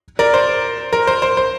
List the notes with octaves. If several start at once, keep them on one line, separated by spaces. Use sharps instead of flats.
A#4 D5
C5
A#4
C5
C5
C5